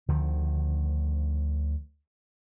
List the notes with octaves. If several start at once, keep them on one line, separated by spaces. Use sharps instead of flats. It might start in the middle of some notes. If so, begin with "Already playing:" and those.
D2 D3 D#3 F3